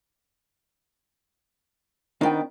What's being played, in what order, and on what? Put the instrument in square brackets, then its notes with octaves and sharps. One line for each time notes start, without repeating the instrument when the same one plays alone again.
[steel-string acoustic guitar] D#3 B3 G5 [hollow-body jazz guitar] C4 D4 D#4